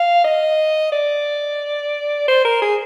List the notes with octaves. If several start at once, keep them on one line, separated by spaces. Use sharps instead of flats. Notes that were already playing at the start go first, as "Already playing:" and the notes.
Already playing: F5
D#5
D5
C5
A#4
G#4